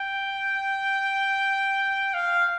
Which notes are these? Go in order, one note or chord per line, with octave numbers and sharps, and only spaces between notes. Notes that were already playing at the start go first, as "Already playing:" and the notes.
Already playing: G5
F5